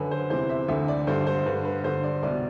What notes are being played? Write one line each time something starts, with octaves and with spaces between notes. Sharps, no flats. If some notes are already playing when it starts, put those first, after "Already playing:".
Already playing: F#2 D3 B4
C5
E2 C3 E3 C5
E5
D2 D3 E5
D5
G2 D3 C5
C5
G2 D3 B4
B4
G2 D3 C5
D5
C2 B2 D5